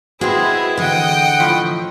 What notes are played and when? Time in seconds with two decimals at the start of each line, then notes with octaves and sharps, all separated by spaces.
0.21 G#3 C4 E4 F#4 G#4 B4 C5 E5
0.77 D3 E3 D#5 F#5 G5
1.40 A2 F3